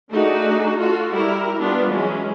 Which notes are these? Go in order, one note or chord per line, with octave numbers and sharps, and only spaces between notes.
A3 D4 D#4 F#4 G#4
F4 F#4 A4
G3 E4 A#4
G3 B3 D4 E4 F4
E3 F#3 G#3 C#4